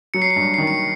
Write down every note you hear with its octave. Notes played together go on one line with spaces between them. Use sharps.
F#3 C#7
C7
C#7
G2
D#3 C7
C#7